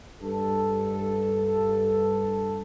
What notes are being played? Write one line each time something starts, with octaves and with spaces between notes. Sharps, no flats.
G2 A4